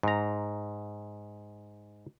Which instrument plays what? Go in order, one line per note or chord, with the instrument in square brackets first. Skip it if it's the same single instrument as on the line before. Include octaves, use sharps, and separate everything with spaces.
[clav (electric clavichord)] G#2 A#5